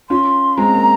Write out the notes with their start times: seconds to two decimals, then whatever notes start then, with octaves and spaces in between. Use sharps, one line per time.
0.10 C#4 F4 C6
0.57 G#3 C4 A#5
0.74 A#3